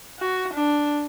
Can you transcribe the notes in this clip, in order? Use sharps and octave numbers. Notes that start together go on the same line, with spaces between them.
F#4
D4